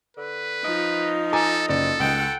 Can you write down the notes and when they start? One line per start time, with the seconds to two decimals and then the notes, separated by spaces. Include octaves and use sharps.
0.17 D3 B4
0.64 F3 D#4 D#5
1.33 A4 G#5 A#5 D6
1.69 F#1 A4 D5
2.00 C#2 F#5 G5